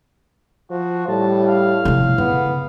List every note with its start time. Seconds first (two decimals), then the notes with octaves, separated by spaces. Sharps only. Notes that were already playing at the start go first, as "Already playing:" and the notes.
0.70 F3 F#4
1.08 A2 G3 A5
1.48 F5
1.85 A2 C3 F3
2.18 C#3 B3